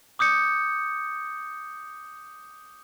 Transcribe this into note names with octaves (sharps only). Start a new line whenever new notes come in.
D6 D#6 G6 C#7